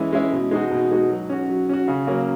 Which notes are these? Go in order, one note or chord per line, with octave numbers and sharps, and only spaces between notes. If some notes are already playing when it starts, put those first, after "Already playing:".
Already playing: E3 G#3 C#4 E4
G#3 C#4 E4
B2
G#3 D#4 F#4
B2
G#3 D#4 F#4
F#3
C#4 F#4
F#3
C#4 F#4
C#3
F#3 A#3 C#4